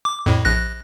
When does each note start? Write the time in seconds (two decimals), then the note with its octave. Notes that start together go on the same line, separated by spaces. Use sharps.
0.05 D6
0.26 F2 A2
0.45 A#1 F#6 A#6